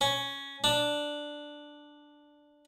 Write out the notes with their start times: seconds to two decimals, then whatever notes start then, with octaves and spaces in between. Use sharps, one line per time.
0.01 C#4
0.64 D4